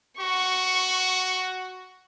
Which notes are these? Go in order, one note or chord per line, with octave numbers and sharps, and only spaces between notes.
F#4 C#6